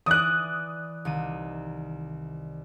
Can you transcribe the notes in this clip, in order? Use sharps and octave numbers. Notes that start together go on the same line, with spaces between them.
E3 D5 G#5 D#6 F#6
C2 D#3 D#7